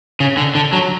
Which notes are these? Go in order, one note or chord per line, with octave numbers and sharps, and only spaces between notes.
C#3
D3
D3
F#3